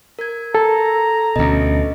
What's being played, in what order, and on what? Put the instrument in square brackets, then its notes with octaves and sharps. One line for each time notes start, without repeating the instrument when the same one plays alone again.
[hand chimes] A#4 G#6
[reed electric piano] A4 [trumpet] A#5
[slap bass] D2 B2 [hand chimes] C#4 D#5